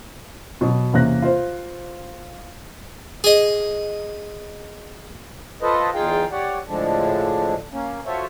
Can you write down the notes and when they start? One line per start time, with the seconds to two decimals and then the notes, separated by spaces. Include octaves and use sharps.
0.61 B2 F#3
0.93 E2 C3 A#3 C#4 F#6 A#6
1.22 F4 C5
3.24 G#4 D#5
5.62 F4 A4 B4 C5 D#5
5.94 E2 D#4 F4 G#4 F5 G5
6.32 G4 C#5 D5 F#5
6.67 A2 D3 F3 G#3 D4
7.72 A#3 C#4
8.06 F4 F#4 A4 C5 C#5 E5